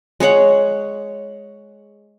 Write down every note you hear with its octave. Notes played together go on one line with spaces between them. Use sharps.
G#3 G#4 C#5 F#5